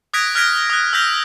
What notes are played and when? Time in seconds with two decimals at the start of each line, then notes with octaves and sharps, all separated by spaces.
0.14 D#6 F#6 G#6 A#6 B6 D7
0.35 F6 F#6 G#6 A#6 B6 D7
0.70 D#6 F#6
0.93 E6 F6 G6 A#6 B6 F7